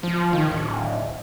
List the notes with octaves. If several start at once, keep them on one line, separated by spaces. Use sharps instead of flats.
F3
D#3
D1